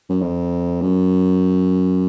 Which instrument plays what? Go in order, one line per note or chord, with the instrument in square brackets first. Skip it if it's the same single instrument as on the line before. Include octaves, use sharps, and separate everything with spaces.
[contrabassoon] F#2
F2
F#2